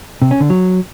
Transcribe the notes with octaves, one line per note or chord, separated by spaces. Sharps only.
C3
C#4
D3
F#3